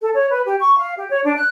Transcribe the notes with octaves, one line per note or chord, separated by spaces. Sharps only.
A4
C#5
B4
G4
C#6
F5
G4
C#5
D4
F#6